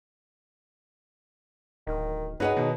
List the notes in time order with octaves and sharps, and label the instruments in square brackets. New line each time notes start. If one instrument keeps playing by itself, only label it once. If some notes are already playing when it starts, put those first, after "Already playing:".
[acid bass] D1 [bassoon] D#3
[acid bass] G2 [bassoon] F#3 [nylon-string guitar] D#4 G#4 D#5 [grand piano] B4 F#5
[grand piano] B2 [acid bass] D#3